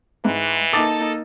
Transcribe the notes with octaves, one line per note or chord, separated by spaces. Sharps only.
G#2 E3
A#3 D#4 A4 D6 D#6 A6